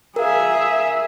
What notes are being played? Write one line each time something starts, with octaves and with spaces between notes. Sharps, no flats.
G#4 A#4 E5 F5